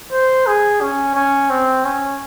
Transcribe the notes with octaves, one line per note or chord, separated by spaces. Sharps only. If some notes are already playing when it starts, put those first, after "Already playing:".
C5
G#4
C#4
C#4
C4
C#4